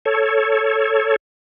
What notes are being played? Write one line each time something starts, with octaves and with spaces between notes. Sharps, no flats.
A4 C#5